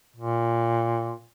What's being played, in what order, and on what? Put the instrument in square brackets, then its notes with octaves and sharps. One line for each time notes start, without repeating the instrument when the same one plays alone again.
[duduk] A#2